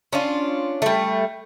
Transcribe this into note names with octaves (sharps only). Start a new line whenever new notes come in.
C#4 D4 F4
G3 A3